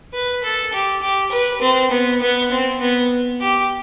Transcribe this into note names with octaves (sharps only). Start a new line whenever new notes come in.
B4
A4
G4
G4
B4
C4
B3
B3
C4
B3
G4